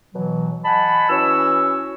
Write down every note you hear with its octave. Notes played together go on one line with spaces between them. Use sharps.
B2 E3 F#3
D#5 F#5 G#5 A5 B5
E3 C#4 F#4 C#5 E6